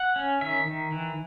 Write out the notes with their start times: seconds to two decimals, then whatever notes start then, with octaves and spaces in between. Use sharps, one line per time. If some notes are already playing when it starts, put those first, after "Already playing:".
Already playing: F#5
0.16 C#4
0.41 D#3 E5
0.67 D#3
0.92 E3